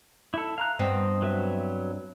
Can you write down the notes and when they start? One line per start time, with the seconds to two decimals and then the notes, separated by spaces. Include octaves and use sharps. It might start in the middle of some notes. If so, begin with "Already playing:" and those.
0.34 E4 A4
0.58 F5 A#5 F#6
0.79 G2 B3 C4 D#5
1.22 F#3 B4 E5